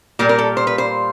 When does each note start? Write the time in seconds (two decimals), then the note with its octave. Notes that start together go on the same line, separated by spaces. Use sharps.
0.19 A#2 G3 A#3 A#4
0.29 A#4
0.39 A4
0.57 C5
0.67 B4
0.78 C5